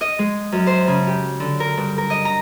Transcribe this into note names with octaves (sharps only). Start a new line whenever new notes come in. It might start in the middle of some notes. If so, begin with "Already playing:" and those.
D#5
G#3
F#2
C5
C#3
G4
D3
A#4
G2
A#4
D#5
A#5